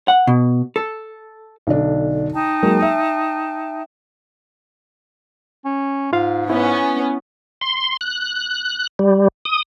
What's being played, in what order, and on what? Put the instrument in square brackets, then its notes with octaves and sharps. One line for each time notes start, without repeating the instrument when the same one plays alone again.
[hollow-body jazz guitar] F#5
B2
A4
[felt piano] B1 D3 D4
[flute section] D#4 G5 A5
[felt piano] F#3 G#3 A#3
E5
[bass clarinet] C#4
[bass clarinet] G#2 [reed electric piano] F4 F5
[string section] B3 C#4 [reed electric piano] E4
[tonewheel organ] C6
F#6
G3
D#6